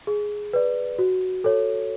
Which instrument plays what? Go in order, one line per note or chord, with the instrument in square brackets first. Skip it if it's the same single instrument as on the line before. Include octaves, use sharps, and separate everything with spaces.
[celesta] G#4
B4 D5
F#4
A4 C#5